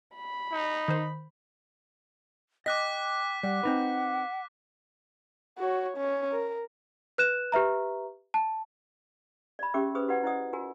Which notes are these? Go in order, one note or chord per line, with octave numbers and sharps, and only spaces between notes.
B5
D#4
D#3 C5
D#5 G5 D6 F#6 B6
G3 F#5
C4 D#4 B4
F#4 C#5
C#4
A#4
B4 F#6 E7
G4 B4 E5 A#5
A5
D5 B5
C#4 G4 G#4 E5 D6 E6
G#4 B4 C5 D#6
E4 F#4 B4 D5 F#5
E4 C5 D5 D#5 F#5 D#6
F4 F#4 A#4 G#5